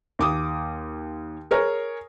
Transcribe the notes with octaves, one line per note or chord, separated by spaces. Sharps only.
D#2 D6 D#6
G#4 A#4 C#5